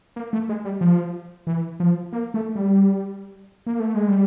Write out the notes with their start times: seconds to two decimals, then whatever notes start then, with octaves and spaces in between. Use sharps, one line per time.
0.16 A#3
0.33 A3
0.49 G#3
0.65 G3
0.81 F3
1.47 E3
1.80 F3
2.12 A#3
2.34 A3
2.55 G3
3.66 A#3
3.80 A3
3.94 G#3
4.08 G3